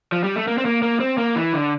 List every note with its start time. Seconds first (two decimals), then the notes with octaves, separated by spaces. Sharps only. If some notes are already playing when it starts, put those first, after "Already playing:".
0.12 F3
0.24 G3
0.36 A3
0.47 A#3
0.58 C4
0.65 A#3
0.82 A#3
1.00 C4
1.18 A#3
1.36 E3
1.54 D3